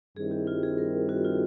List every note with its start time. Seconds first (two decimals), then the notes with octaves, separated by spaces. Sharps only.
0.16 G2 D#3 G3 C4 E4 G#4
0.31 G4
0.47 F4
0.63 G#4
0.78 A#4
1.09 F#4
1.25 F4